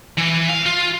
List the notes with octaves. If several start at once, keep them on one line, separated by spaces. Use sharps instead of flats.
E3
F5
F4